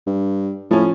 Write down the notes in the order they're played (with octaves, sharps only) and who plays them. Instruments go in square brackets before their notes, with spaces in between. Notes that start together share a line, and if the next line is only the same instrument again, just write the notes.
[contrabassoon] G2
[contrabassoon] A2 [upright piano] F3 C#4